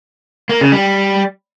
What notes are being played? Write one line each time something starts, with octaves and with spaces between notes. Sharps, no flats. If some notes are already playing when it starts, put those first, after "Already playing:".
A#3
C#3
G3